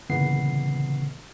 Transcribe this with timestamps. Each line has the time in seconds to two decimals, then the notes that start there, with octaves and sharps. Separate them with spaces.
0.10 G1 A#2 C#3 E3 B3 C7